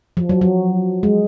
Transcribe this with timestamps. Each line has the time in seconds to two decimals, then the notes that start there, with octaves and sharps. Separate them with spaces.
0.17 F3
0.29 F#3
0.41 F#3
1.03 G#3